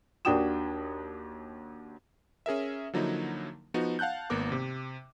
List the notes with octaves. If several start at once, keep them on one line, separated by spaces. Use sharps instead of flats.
D#2 D4 F#4 G5 D#6 E7
C#4 G#4 A#4 E5
D3 F3 F#3 A#3 D#4 E4
F3 B3 D#4 F#4
F5 F#5 A5 F#6 G6
G#1 A#3 B3 A#4 D6
C3